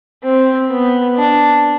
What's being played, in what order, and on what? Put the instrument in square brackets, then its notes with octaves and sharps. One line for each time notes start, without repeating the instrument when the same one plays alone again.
[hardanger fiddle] C4
B3
D4